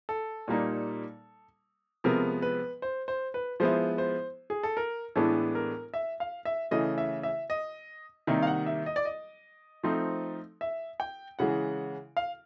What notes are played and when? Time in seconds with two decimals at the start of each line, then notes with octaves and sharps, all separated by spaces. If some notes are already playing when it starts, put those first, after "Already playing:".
0.09 A4
0.48 A#2 G3 A#3 D#4
2.04 C3 F3 G#3 B3 A#4
2.42 B4
2.82 C5
3.08 C5
3.34 B4
3.60 F3 G#3 B3 E4 C5
3.98 C5
4.50 G#4
4.63 A4
4.77 A#4
5.15 A2 E3 G#3 B3 D4 A4
5.55 A#4
5.94 E5
6.20 F5
6.45 E5
6.71 C#3 E3 A3 D#5
6.98 E5
7.23 E5
7.50 D#5
8.27 C3 D#3 G3 A#3 D#4 E5
8.42 F5
8.47 F#5
8.66 E5
8.86 D#5
8.96 D5
9.05 D#5
9.83 F3 A3 C4 D#4
10.61 E5
11.00 G5
11.39 C#3 E3 G#3 F#5
12.17 F5